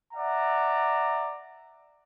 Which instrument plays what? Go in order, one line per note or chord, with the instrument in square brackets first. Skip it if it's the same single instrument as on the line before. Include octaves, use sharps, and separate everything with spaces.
[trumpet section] D5 E5 F#5 A#5